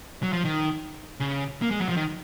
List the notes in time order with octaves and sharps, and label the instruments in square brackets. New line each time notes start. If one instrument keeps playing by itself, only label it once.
[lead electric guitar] F#3
F3
D#3
C#3
A#3
G#3
F#3
F3
D#3